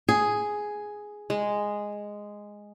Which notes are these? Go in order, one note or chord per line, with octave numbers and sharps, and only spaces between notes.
G#4
G#3